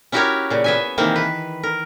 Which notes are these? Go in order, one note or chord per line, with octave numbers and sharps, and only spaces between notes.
C#4 E4 F#4 G4 A#4 C#5
A#2 C#3
B3 E5 G#5
C3 D#3 E3 A#3 C4
B4
A#4